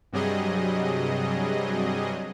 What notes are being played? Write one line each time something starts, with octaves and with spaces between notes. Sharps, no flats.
G2 C3 F#3 G3 G#4 D#5